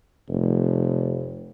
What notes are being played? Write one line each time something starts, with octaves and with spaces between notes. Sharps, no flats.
F1